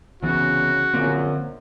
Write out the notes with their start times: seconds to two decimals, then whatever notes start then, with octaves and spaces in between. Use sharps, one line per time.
0.22 C2 C#3 E3 B3 F#4
0.94 A#1 F#2 D3 A#3 C4